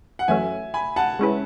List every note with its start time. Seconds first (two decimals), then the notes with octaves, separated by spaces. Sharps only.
0.19 F#5
0.28 F#2 E3 A3 C#4 F#4 E5 G#5
0.74 G#5 B5
0.96 F#5 A5
1.19 G#3 C#4 E4 B4